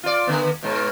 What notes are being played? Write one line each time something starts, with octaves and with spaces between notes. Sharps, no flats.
F4 D5
D3 B3
G#2 B2